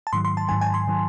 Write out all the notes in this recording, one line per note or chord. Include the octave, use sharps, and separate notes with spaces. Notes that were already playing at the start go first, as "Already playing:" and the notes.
A5
G#2 D#3 F#3 C6
C6
A5
G#2 D#3 F#3 G#5
G#5
C6
D#3 F#3